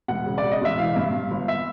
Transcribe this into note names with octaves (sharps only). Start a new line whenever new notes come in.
E1 F#5
C#3
D5
C#3
D#5
E1 E5
E3 F5
G2
G2
G1
E5